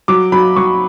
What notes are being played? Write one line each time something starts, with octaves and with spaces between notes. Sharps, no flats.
F#3 D6
F#3 B5
F#3 C#6